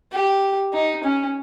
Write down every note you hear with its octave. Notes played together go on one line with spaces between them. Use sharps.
G4
D#4
C#4